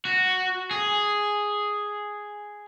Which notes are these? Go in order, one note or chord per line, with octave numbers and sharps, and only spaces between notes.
F#4
G#4